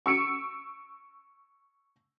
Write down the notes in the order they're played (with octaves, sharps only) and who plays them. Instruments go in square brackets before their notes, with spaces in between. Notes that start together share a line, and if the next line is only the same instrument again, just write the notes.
[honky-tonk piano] C#6 E6 C#7 D7